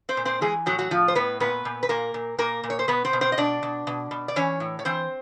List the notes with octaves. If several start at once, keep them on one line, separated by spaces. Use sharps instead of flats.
C4 C5
A#2
C4 C5
E3 G#3 G#4
A2 F#3 F#4
F#3 F#4
A2 F3 F4
C5
A2 B3 B4
A#2 B3 B4
A#2
B4
A#2 A#3 A#4
A#2
A#2 A#3 A#4
A#2
C#5
C5
B2 B3 B4
C4 C5
B2
C4 C5
D#5
B2 D4 D5
B2
B2
B2
D5
E3 C#4 C#5
A2
C#5
E3 C4 C5